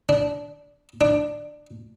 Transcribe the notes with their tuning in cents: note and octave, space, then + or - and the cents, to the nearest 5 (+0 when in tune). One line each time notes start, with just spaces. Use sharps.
D4 -15
D4 +15